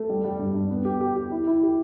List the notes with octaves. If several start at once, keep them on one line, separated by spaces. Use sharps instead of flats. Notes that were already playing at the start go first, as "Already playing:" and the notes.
Already playing: A3
G3
G3
G2
G2
B3
G4
G4
G4
E4
E4
G4